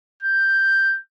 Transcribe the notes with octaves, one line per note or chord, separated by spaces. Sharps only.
G6